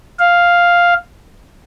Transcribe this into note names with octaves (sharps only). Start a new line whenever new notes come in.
F5